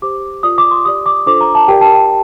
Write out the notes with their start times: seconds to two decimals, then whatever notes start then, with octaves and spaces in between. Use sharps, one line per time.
0.02 G4 C5 D6
0.43 F4 A#4 D5 D#6
0.58 D6
0.71 C6
0.85 G4 D5 D#6
1.06 D6
1.26 D4 F4 A4 C5 D6
1.41 A#5
1.55 A5
1.68 G4 A#4 D5 G5
1.81 A5
1.94 G5